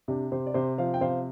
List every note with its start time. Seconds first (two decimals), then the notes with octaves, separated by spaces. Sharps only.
0.08 C3 D4 G4
0.32 C3 G4 C5
0.46 D5
0.54 C3 G4 C5
0.78 F3 C5 F5
0.94 G5
1.01 C3 C5 F5